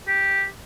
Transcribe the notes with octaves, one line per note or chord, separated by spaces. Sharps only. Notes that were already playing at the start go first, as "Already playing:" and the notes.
G4